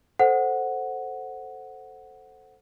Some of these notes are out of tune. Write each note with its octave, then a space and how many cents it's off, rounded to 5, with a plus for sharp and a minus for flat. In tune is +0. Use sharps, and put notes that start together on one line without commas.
A4 +0 C5 +0 F#5 +0